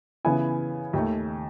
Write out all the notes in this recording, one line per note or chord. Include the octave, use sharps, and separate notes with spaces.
C#3 E3 B3 E4 G#5
D#2 D#3 A3